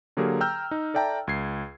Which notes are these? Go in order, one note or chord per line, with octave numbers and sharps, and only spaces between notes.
D3 F#3 A#3 G4 G#4 A#4
G5 A#5 E6 F6 G6
D#4
A4 D5 E5 G5 A5 A#5
C#2 G#6 C7